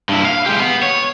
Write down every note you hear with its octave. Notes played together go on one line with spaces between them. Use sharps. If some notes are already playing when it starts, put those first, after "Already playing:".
G2 E4
F5
G#3 G4
B3
C#5